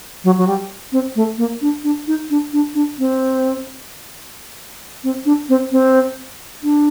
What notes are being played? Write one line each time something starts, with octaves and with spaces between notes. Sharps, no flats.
F#3
F#3
G3
C4
A3
A#3
D4
D4
D#4
D4
D4
D4
C4
C4
D4
C4
C4
D4